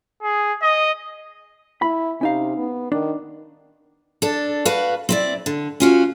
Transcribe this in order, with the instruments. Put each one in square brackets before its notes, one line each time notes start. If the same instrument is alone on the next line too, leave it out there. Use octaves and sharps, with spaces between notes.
[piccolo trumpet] G#4
D#5
[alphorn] E4 [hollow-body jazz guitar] B5
[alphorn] C3 [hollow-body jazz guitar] C#4 D#4 F5
[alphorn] B3
[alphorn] D#3 [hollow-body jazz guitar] D4
[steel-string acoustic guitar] D4 A4
F#4 B4 F5
C4 E4 D5
D3
C#4 F4 F#4